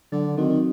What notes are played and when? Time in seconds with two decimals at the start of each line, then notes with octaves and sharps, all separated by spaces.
0.12 D3 F#3
0.38 D#3 C4 F#4